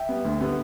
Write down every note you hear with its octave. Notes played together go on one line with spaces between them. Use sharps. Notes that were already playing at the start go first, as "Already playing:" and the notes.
Already playing: E5 G5
G3 B3
D2
D3 G3 B3